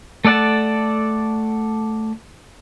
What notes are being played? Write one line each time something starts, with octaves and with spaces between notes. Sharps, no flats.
A3 A4 D5 F#5 A5